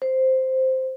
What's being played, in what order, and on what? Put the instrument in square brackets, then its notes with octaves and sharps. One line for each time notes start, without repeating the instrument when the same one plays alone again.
[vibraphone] C5